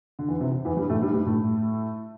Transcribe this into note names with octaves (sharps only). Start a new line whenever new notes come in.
D3
E2 E3
C3
E2 E3
G2 G3
A2 A3
G2 G3
G2 G3
A2 A3